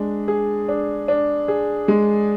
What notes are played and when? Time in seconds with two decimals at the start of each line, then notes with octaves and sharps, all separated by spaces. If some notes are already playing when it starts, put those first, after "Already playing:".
Already playing: G#3 D4
0.28 G#4
0.68 D4
1.08 D4
1.48 G#4
1.88 G#3